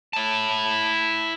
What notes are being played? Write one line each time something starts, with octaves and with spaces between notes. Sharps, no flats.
E4 A5